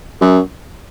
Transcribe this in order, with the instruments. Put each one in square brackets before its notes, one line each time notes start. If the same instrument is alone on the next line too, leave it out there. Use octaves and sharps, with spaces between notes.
[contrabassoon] F#2